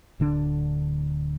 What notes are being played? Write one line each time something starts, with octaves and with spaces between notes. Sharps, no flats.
D1 D3 D4